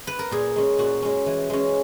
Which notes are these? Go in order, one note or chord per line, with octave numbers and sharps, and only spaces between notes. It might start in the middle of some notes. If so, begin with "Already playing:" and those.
B4
A#4
A#2 G#4
G#3 C#4
A#2 F#4
G#3 C#4
E3
G#3 C#4